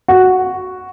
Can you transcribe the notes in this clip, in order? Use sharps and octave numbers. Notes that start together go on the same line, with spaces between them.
F#4